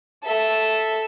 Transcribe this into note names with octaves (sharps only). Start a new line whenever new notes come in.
A4 E5